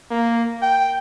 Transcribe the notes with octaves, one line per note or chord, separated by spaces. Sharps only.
A#3
G5